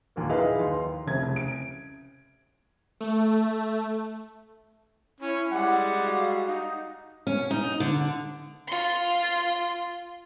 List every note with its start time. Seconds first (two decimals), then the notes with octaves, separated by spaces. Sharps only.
0.16 D#2 A#2 A#3
0.29 D#4 E4 G#4 B4 D#5 F5
0.60 D#2 C6
1.07 F1 C2 C#3 G#6
1.36 D7
3.01 A3
5.21 C#4 E4
5.52 G3 G#3 F#5
6.05 F#4 F5
6.47 D#4
7.27 C#4
7.51 D#4
7.80 D3
8.68 F4 C6